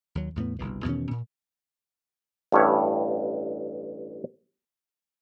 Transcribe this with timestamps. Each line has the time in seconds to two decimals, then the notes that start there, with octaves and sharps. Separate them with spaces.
0.15 D#2 F#3
0.36 E2 A2 A3 B3
0.59 G1 C2 B2
0.84 E2 B2 D#3 C#4
1.11 A#2
2.52 A1 G2 E4 C#5